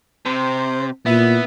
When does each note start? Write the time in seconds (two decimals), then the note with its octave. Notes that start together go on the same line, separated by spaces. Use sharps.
0.26 C3 C5
1.06 A#2 B3 E4